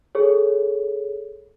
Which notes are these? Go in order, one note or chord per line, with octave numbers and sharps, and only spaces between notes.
G#4 A4 C#5